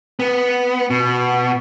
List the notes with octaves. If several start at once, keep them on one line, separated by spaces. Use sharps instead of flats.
B3
B2